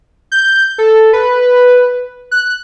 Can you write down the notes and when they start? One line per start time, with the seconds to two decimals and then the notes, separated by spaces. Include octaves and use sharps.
0.32 G6
0.78 A4
1.13 B4
2.31 F#6